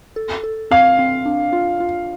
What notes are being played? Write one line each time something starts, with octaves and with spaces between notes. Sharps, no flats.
A4
A4
C4 F5
C4
D4
F4
F4